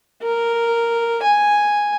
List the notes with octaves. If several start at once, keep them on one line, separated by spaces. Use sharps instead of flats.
A#4
G#5